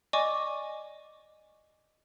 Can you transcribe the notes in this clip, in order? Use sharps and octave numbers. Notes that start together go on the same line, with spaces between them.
D5 D#5 G#5 C#6 D6